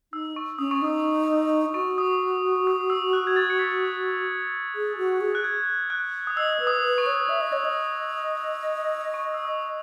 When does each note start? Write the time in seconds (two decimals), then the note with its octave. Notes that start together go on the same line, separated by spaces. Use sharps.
0.13 D#4 E6
0.36 C#6
0.59 C#4 D#6
0.71 C#6
0.82 D#4 D#6
1.74 F#4 C#6
1.98 D#6
2.67 D#6
2.90 E6
3.13 F#6
3.27 G#6
3.36 A6
3.50 C#7
3.59 B6
4.75 G#4
4.98 F#4
5.21 G#4
5.35 F#6
5.44 G#6
5.90 F#6
6.27 D#6
6.37 D#5 E6
6.60 B4
6.67 D#6
6.83 B4
6.98 C#6
7.06 C#5
7.29 E5
7.41 D#5
7.53 C#5
7.65 D#5
9.14 C#6
9.34 E6
9.45 D#6